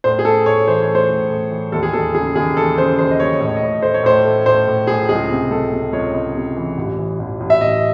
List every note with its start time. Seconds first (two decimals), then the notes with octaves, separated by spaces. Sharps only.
0.04 A2 C5
0.19 G#4
0.25 A3 A4
0.46 A2 C#5
0.67 E3 C5
0.81 C#5
0.88 A3
0.95 C5
1.09 A2
1.30 A2
1.51 E3
1.72 D#2 A4
1.83 G#4
1.93 D#2 A4
2.15 C#3 G#4
2.35 D#2 G#4
2.57 E3 A4
2.78 C#3 C5
2.99 D#2 C5
3.11 D#5
3.20 D#2 C#5
3.40 A2 D#5
3.49 C#5
3.57 D#5
3.62 A2
3.82 A3 C5
3.94 C#5
4.03 A2 C5
4.25 A3
4.46 A2 C5
4.67 A2
4.87 A2 G#4
5.09 C#2 G#4
5.30 C3
5.51 C#2 A4
5.72 C3
5.93 C#2 C#5
6.14 C#2
6.35 C3
6.56 E3
6.78 A1
6.99 E3
7.19 A1
7.40 A1
7.50 E5
7.61 A1 D#5